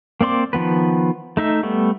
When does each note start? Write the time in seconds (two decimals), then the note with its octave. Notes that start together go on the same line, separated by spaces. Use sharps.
0.21 A#3 C4 D5 C6 D6
0.53 D#3 F3 B3 B4
1.37 A3 D#4 E5
1.63 G3 A3 B3